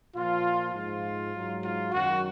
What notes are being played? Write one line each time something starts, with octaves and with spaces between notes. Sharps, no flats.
A#2 F3 F4
G#2 F3 F4
G#2 F#3
F4
F#2 D#3 F#3 F#4